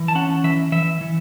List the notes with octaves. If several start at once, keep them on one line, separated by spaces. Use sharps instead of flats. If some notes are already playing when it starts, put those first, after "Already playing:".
Already playing: E3
A5
C#4 F#5
E3 E5
E3 E5
E3